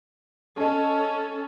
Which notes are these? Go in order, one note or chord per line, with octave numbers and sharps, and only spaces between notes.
C#4 A4 D#5 A5